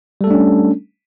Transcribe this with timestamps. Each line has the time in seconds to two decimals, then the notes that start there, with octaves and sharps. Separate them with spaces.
0.21 G3
0.24 A4
0.27 A3
0.31 D4
0.34 C#4